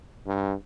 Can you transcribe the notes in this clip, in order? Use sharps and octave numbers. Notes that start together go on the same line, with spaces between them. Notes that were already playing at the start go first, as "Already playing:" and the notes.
G2